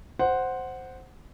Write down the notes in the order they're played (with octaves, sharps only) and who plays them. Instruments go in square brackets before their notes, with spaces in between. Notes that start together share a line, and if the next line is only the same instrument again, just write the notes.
[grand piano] C5 F#5